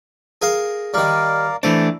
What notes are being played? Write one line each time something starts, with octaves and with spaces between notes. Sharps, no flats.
G#4 A#4 F5
D#3 G3 A#4 D5 F5
E3 A3 D4 C5